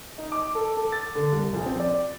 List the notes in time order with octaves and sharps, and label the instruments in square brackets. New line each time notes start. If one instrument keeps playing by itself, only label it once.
[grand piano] D#4
D6
A4
A4
A6
D3
C2
A#1
C4
D5